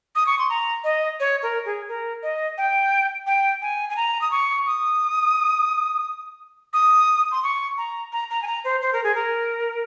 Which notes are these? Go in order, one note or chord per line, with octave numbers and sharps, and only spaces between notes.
D#6
C#6
C6
A#5
D#5
C#5
A#4
G#4
A#4
D#5
G5
G5
G#5
G#5
A#5
D#6
C#6
D#6
D#6
C6
C#6
A#5
A#5
A#5
G#5
A#5
C5
C5
A#4
G#4
A#4